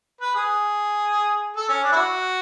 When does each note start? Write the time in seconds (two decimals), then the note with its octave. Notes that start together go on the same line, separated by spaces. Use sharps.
0.21 B4
0.35 G#4
1.57 A4
1.69 C#4
1.83 D4
1.92 E4
1.96 F#4